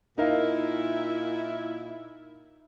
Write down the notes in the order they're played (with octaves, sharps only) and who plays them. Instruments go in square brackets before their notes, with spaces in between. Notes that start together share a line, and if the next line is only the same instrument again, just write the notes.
[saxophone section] A#2 E4 [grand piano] D#4 A#4 F5